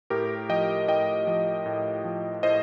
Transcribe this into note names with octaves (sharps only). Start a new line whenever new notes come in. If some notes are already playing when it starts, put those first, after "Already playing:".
A2 G4 A#4
F3 D#5 G5
A2 D#5 G5
F3
A2
F3
A2 C5 D#5